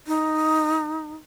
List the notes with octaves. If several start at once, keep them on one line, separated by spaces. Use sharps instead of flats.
D#4